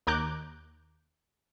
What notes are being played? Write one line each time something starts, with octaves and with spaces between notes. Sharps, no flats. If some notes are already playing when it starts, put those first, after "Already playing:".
D#2 A#5 D6 F#6 G6